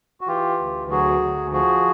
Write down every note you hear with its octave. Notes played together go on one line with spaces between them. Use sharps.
F#4
E3 F4 G4
D2
F#3 F#4 G#4
D2
F3 F#4 G#4